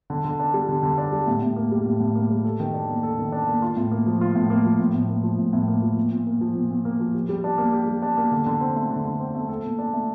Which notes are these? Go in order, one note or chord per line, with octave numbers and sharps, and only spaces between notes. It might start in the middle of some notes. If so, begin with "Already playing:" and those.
D3
D3
D4
G3
D3
D3
D4
G3
A2
A2
A#3
G3
A2
A2
A#3
G3
A4
D#3
D4
A#3
A4
D#3
D4
A#3
F4
A2
A#3
F3
F4
A2
A#3
F3
A2
A2
A#3
F3
A2
A2
A#3
F3
A#2
A#2
A#3
F3
A#2
A#2
A#3
F3
G4
G3
D4
A#3
G4
G3
D4
A#3
D3
D3
C4
A3
D3
D3
C4
A3
A4
A#2
D4
A3